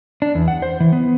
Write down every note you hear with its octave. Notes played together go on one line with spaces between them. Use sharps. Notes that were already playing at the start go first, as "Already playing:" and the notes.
D4
E2
F#5
C5
E3
B3